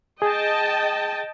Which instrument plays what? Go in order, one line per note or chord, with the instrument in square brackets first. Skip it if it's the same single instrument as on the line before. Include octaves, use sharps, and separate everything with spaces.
[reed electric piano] G#4 [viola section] D#5 G5 A5